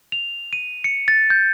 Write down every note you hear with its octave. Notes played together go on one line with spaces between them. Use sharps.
F7
D#7
C#7
A6
G6